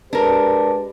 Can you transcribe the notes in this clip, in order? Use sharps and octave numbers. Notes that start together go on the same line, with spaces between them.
G#3 D4 G4 A#4 B4